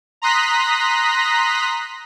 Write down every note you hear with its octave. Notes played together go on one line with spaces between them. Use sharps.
A#5 C6 D#6 F#6 A#6 B6